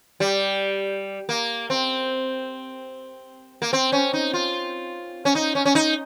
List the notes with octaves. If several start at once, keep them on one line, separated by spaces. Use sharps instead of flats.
G3
A#3
C4
A#3
C4
C#4
D#4
F4
C#4
D#4
C#4
C#4
D#4